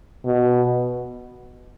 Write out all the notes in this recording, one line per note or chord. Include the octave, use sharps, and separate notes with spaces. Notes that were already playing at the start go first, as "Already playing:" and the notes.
B2